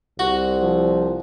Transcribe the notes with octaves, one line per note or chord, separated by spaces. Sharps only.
C2 F#4
F3